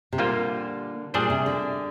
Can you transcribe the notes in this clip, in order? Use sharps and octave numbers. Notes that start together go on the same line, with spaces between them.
C3
A#2 D3 G3 A#3 F4 C5
A#2 G3 D4 G#4 C5
C3
D3